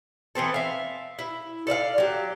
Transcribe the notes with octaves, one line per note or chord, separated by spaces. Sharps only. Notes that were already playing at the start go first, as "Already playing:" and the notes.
E3 B3 C4 A4
E5 F5
E4
A4 D5 E5 F5
F#3 G4